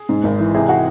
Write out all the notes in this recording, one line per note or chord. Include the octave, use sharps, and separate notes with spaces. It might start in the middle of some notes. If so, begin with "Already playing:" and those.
Already playing: G#4
G#2
G#1
E3
C3 G#4 G#5
F#4 F#5